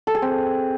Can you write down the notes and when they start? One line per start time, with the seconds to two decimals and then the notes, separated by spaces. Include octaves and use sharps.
0.07 A4
0.15 G#4
0.22 C4